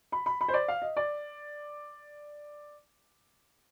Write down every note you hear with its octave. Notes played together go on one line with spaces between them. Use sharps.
B5
B5
B5
C5
D5
F5
D#5
D5